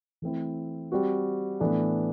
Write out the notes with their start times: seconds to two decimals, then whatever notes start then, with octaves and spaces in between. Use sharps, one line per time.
0.22 E3 A3 C4 E4
0.92 G3 C4 F#4
1.60 A2 E3 B3 D4 A4